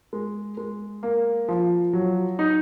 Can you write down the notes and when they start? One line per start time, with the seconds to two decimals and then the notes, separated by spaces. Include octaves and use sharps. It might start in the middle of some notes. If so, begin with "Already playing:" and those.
0.13 G#3
0.57 G#3
1.03 A#3
1.49 F3
1.93 F#3
2.39 D#4